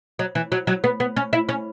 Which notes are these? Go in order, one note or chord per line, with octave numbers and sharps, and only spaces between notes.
F#3
E3
F#3
F#3
B3
B3
C#4
E4
C#4